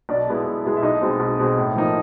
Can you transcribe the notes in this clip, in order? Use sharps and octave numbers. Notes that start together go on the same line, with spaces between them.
B1 D4 D5
B2 G#3 B3 E4
B1
B2 G#3 B3 E4
E5
B1 D#4 D#5
B2 G#3 C4
B1
B2 G#3 C4
A2
F3 A#3 D#4